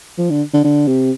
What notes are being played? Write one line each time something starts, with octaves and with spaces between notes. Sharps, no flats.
F3
D3
D3
D3
C3